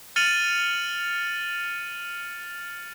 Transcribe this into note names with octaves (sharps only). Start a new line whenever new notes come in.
F6 A6 C#7 D#7 F7 F#7